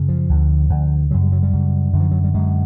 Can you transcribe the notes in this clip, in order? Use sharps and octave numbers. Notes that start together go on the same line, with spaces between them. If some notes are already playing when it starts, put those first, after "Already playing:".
Already playing: F#2 C#3
F3
D2 D3
D2 D3
F#2 C#3 F#3
G3
F#3
G3
F#2 C#3
F#2 D3
F3
F#3
G3
F#2 D3 G#3